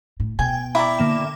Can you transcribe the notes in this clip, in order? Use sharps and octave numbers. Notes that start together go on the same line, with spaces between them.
A2
B2 G5 G#5
E4 D5 G5 A#5 D6
D3 A#3 E7